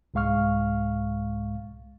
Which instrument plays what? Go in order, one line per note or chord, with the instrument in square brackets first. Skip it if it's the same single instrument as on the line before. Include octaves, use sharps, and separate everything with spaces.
[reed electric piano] C2 G#2 G#3 F5 C#6 F6